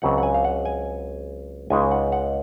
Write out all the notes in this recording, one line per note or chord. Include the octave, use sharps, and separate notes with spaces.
C#2 C#3 F#3 C4 F#5
F#5
G#5
F5
F#5
G#5
C#2 C#3 G#3 D#4 G#5
F#5
F#5